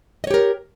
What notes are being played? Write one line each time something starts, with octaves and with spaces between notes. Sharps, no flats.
G4 A#4 C#5 D#5